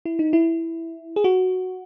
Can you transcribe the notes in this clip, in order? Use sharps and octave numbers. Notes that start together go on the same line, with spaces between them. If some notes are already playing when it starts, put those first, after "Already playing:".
E4
D#4
E4
G#4
F#4